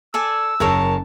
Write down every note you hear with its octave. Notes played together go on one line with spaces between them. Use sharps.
A4 D5 G#5 E6
F#1 G#4 A#4 C#5 A5